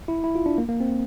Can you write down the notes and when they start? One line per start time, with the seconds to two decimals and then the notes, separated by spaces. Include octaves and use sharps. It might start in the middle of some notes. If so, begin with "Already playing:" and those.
0.08 E4
0.24 E4
0.35 F4
0.46 D4
0.58 A#3
0.69 A#3
0.80 C4